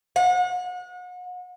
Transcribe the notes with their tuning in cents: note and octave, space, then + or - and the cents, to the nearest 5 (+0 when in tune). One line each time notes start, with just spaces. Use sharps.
F#5 -35